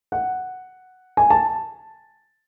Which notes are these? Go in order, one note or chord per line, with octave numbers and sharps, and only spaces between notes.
F#5
G#5
A5